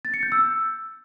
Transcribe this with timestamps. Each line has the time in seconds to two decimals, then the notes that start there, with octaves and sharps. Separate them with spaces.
0.05 A6
0.14 C#7
0.23 G6
0.32 E6